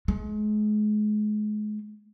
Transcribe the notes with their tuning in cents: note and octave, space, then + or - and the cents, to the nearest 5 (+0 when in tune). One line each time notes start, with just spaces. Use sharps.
G#3 +35